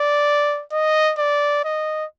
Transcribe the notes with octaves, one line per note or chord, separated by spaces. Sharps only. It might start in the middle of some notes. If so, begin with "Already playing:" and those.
Already playing: D5
D#5
D5
D#5